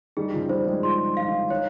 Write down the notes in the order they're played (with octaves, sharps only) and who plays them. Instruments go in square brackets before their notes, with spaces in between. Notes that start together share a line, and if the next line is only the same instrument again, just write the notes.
[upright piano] D#3 G3 [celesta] G#4
[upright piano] C#3 F3
[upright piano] D#3 G3 [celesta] C5
[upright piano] F3 G#3
[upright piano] F3 G#3 [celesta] C6
[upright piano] F3 [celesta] F5
[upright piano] D#3
[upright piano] D#3 [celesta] C#5